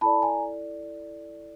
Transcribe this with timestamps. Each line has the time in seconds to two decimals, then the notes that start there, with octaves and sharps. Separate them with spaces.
0.01 E4 A4 D5 A5 B5
0.22 G#5 A#5